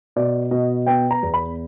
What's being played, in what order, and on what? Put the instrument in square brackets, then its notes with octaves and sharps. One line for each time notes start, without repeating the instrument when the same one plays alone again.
[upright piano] B2 D5
B2 D#5
B3 G5
A#5
E2
B5